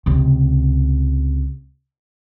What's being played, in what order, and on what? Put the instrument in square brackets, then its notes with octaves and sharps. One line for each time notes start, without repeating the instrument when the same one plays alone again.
[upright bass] C#2 C3